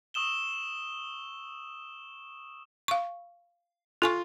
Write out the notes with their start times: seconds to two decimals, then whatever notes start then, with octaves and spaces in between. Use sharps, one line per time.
0.14 C#6 D#6 E6 E7 G7
2.88 F5 C#6
4.02 F4 A4 G#5 C#6